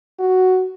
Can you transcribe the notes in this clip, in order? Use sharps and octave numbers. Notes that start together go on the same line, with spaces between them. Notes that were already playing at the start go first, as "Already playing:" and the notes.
F#4